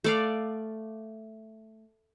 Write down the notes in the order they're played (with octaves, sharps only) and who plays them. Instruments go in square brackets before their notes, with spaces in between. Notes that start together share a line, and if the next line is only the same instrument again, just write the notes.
[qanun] A3 D5 F5